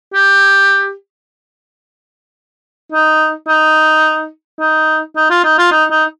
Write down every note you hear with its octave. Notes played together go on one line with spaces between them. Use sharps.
G4
D#4
D#4
D#4
D#4
F4
D#4
F4
D#4
D#4